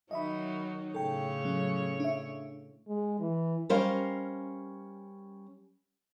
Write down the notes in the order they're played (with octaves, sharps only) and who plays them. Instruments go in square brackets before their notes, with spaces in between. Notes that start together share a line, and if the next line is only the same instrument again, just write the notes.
[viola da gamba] D#3 F#3 D#4 [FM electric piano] D#5 E5 B5
[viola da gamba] A2 C#3 C#5 [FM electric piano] A4 G5
[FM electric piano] F#3 C#4
D4 E5
[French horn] G#3
E3
[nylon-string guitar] G3 C#4 A#4 C5 D#5 F5